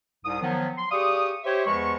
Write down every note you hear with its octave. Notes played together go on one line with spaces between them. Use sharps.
C2 G#2 D#6
D#3 F3 F#3 B3
C6
G4 G#4 D5 F5 C#6 D#6
G4 C5 C#5 E5
E2 F3 G#3 B4 C#6